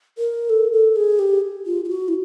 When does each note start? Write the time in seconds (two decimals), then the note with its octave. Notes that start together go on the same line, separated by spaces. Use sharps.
0.18 A#4
0.50 A4
0.73 A4
0.96 G#4
1.19 G4
1.66 F4
1.85 F4
1.89 F#4
2.08 E4